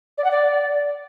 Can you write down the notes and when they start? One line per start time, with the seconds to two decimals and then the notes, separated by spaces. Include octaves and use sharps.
0.18 D5
0.24 F#5
0.31 D5